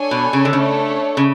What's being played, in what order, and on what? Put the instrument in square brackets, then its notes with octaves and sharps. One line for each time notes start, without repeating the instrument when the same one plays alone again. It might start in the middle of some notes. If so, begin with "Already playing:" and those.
Already playing: [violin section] D4 A4 C#5 G#5
[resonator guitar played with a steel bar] B2
C#3
D3
[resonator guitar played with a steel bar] C#3 [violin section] A3 D4 A4 C#5
[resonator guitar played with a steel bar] C#3